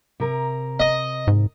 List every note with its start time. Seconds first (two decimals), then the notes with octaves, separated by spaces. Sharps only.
0.20 C3 A#4 A#5
0.80 D#5
1.27 G#2